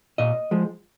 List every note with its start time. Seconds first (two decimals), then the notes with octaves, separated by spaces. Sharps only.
0.18 A#2 D#5
0.51 F3 G#3